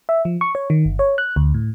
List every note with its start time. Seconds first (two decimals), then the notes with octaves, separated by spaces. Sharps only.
0.09 E5
0.25 F3
0.41 C#6
0.55 C#5
0.70 D#3
0.85 G1
0.99 C#5
1.18 F#6
1.36 D2
1.54 A2